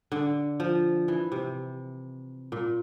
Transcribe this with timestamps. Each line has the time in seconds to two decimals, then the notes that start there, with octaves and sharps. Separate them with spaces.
0.12 D3
0.60 F3
1.08 E3
1.32 C3
2.52 A#2